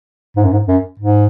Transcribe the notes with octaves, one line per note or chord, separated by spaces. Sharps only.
G#2
F#2
G#2
F#2
G#2